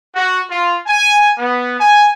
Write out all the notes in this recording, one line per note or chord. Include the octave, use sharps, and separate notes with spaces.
F#4
F4
G#5
B3
G#5